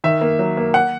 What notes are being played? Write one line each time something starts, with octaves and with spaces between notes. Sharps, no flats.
D#3 E5
A#3
F#3
A#3
F#5